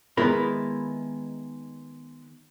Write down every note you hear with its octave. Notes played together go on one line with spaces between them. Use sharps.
D#3 G#3 B3 E4 A#4 B4